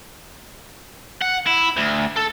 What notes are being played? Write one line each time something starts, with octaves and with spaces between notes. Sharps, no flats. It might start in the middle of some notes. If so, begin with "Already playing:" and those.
F#5
E4
D2
A4